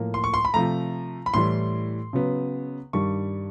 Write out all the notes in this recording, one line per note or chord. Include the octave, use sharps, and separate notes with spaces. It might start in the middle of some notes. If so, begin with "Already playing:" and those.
Already playing: A2 F3 A#3
C6
C#6
C6
B5
C3 F3 A3 A#5
B5
A2 E3 G3 C6
C#3 F#3 B3
G2 D#3 G3 C#6